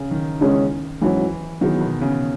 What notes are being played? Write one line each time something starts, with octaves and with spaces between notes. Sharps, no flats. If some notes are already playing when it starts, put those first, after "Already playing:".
Already playing: C#3
D#3
E2 C#3 G#3 C#4 G#4
G#2 E3 F#3 C#4 E4
D#3 F#3 B3 E4 G#4
B2
C#3